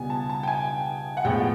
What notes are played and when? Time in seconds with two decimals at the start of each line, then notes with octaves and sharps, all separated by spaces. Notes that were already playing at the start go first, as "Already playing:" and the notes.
Already playing: C#2 B2 G3 B3 G#5
0.10 A5
0.30 A5
0.43 G5
0.48 G#5
1.17 F#5
1.24 A2 F3 G#3 B3 G5